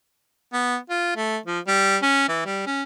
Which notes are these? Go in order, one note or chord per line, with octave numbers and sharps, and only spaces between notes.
B3
F4
A3
F3
G3
C#4
E3
G3
C#4